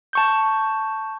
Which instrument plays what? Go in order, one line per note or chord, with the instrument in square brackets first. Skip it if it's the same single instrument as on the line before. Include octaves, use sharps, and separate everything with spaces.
[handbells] A5 C#6 G6